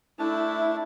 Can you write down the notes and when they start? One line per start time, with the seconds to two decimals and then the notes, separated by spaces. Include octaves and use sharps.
0.19 A3 D4 E4 A5